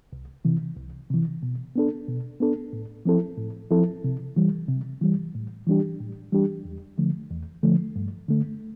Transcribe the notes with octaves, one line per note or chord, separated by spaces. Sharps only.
C2
C3 E3
C2
C3 E3
B2
B3 D4 A4
B2
B3 D4 A4
A2
F3 C4 E4 A4
A2
F3 C4 E4 A4
C3
E3 G3
C3
E3 G3
A2
E3 G3 D4 G4
A2
E3 G3 D4 G4
E2
D3 F3 A3
E2
D3 F3 A3
G2
D3 A3